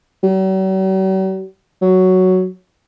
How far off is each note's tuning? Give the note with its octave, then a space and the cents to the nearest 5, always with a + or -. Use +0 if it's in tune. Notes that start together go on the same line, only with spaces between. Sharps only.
F#3 +45
F#3 +5